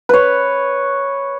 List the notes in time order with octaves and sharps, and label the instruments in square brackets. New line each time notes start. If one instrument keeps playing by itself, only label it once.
[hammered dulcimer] B4 C#5